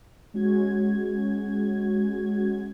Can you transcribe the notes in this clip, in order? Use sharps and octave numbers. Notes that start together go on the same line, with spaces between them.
G#3 C#4 F#4 G#6